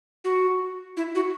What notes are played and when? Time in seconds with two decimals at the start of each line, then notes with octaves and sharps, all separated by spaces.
0.24 F#4
0.97 E4
1.15 F#4